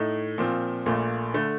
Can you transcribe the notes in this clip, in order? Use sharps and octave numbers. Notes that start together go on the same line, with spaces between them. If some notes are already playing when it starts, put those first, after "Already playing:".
Already playing: A2 A3 D#4
A#2 F3 C4
A#1 A#2 A3
D3 A3